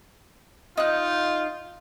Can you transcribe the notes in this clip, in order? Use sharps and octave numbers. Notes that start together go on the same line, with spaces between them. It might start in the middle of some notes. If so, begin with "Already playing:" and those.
D#4 F4 F#6